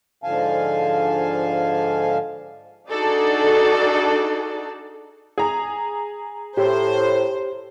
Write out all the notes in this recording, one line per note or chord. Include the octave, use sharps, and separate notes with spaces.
G#2 D3 F3 F5 G#5 A5
D4 D#4 F#4 G#4 A4 D5
G#4 A#5
A2 G4 C5